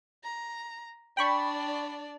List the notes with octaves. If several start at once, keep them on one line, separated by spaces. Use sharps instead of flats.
A#5
D4 D5 G5 B5 C#6